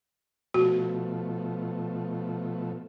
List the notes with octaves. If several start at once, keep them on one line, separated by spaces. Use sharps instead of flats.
B2 F3 A3 F#4